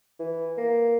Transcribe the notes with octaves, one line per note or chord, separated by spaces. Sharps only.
E3
A#3